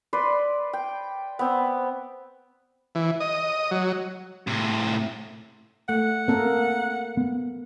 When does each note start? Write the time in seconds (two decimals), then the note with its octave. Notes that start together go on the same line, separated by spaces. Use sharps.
0.13 B4 D5 C6
0.73 G5
1.39 B3 C4
2.95 E3
3.20 D#5
3.71 F#3
4.47 A2 C3
5.89 A3 F#5
6.28 A#3 C4 A4 A#4
7.17 B3